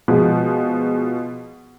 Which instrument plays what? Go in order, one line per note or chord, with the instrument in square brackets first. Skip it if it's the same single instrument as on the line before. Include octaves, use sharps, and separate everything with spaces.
[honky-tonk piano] B2 F3 G#3